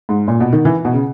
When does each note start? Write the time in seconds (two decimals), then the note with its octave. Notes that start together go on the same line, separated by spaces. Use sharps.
0.09 G#2
0.28 A#2
0.40 B2
0.53 D#3
0.65 E3
0.85 B2
0.93 C#3